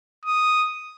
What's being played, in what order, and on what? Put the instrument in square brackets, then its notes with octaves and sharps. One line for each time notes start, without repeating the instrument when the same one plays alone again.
[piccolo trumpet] D#6